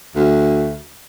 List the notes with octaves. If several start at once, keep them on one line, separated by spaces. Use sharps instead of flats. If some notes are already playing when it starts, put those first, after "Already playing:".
D2